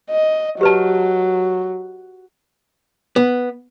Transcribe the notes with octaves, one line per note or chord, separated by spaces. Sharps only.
D#5
F#3 G4 B4 A5
B3